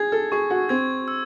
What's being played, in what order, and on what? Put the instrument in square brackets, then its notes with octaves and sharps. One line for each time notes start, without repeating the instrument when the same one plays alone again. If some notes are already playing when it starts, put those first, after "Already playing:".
Already playing: [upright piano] G#4 [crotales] G#6
[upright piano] A4
[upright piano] G#4 [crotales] C#6
[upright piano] F#4
[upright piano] C4 [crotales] G#6
[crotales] E6